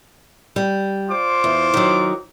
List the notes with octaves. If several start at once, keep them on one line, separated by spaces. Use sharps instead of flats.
G3
F4 C5 D6
E2
D#3 F#3